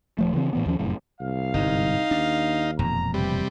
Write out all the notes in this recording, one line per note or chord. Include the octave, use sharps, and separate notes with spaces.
D#1 F3 A3
C#3 E3 G3 C4
A2 E3 B3
D#2 F3 C#4
F1 F#2 A2
C2 F5
G1 G#2 D#4
D#2 D4
E1 F2 A#2 A#5
C3 G3 B4